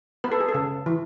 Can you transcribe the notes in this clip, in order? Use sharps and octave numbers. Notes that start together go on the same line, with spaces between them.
B3 B4
A4
G#4
A4
C#3
E3